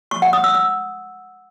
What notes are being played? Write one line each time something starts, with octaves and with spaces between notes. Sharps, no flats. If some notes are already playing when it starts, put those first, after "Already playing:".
C#6
F#5
D#6
E6
E6